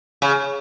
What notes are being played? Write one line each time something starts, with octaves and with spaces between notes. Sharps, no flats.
C#3